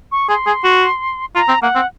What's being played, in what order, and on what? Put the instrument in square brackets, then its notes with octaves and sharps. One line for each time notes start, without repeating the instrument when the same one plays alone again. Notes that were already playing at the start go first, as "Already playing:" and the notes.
[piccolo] C#6
[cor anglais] G#4 [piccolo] C6
[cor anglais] G#4
F#4
[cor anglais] F4 [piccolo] A#5
[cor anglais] C4
[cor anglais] A#3 [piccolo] F#5
[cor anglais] C4